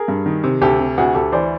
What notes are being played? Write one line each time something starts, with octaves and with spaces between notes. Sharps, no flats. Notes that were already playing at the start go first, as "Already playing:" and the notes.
Already playing: G#4 A#4
G2
D#3
C3
D2 G4 A4
C3
D2 F#4 G#4
D2 G4 A4
E3 C5 D5